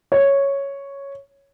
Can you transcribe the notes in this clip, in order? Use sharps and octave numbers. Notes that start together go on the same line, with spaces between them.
C#5